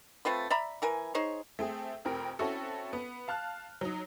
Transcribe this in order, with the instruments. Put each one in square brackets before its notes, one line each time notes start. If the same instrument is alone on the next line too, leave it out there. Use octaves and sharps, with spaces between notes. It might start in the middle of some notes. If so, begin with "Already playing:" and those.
[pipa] A3 C4 F4 B4
D5 E5 A#5 B5
E3 A#4 G#5
D#4 G#4 C5 C#5
[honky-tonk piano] A3 C4 G#4
F1 F2 C4 A#4
C4 C#4 E4 F#4 A4
B3
F5 A5 F6 F#6
F#3 D#4